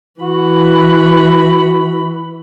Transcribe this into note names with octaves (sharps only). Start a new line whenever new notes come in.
E3 F#4 B5